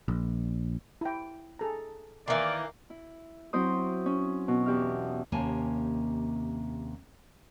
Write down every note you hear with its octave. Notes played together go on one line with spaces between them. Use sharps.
A#1
E4 G5
G#4 A4 A#5
D#3 E3 A#3 D5
E4
F#3 C4 E4 C5 D#6
C#4
B2
E2 G4 E5 F6
D#2 C3 A#3 C#4 G#5 A5